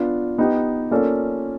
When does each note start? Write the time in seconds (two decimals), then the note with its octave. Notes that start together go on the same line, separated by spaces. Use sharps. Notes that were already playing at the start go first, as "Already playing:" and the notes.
Already playing: B3 D4 F4
0.38 B3 D#4 G4
0.91 A#3 C#4 F4 A4 D5